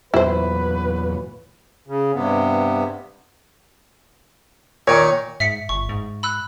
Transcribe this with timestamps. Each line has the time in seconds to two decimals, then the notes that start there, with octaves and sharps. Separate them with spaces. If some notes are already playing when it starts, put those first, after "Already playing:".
0.14 E2 A#2 F#3 E4 B4 C5
1.88 C#3
2.14 G2 C3 B3
4.88 A#2 D#3 C#5
5.40 G#2 E5 B6 C#7
5.69 G1 C#6
5.89 G#2
6.23 B5 E6 F#6